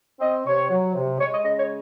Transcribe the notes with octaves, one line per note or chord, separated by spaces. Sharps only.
C4 D#5
C3 C#5
F#3
C3
G#3 C#5
D#5
C#3 D#5
C#5